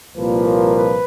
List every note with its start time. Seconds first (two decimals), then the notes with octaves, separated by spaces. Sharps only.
0.15 C2 A#2 F3 A#3 B4
0.76 B4